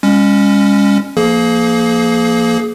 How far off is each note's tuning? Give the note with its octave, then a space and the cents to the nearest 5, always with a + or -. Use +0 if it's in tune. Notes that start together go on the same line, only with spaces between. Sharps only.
G#3 -45 C#4 +0
F3 -30 A#3 +0 G#4 +30